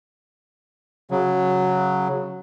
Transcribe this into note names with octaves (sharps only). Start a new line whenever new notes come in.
C#3 F#3